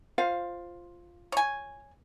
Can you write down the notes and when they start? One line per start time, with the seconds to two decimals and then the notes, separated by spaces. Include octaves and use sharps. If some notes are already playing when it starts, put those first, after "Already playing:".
0.18 F4 C5 F5
1.32 C#5 G#5